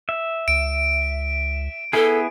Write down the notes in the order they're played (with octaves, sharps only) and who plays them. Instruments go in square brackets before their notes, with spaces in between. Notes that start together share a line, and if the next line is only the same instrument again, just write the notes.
[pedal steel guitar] E5
[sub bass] C#2 [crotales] D7
[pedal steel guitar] B3 E4 G#4 [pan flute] A4